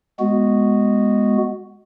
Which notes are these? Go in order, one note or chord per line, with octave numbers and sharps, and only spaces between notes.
G#3 B3 F#4